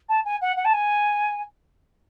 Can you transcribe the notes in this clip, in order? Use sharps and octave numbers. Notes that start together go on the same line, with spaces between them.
A5
G#5
F#5
F#5
A5
G#5